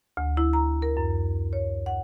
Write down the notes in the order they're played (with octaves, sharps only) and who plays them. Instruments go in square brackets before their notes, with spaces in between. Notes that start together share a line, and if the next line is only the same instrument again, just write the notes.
[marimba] D2
E4
A#5
A#4
F#2
C#5
F#5